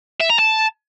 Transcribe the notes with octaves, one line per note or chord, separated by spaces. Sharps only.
E5
A#5
A5